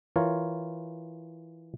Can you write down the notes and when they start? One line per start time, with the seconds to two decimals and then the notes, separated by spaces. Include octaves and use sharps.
0.16 E3 F4 A#4 C#5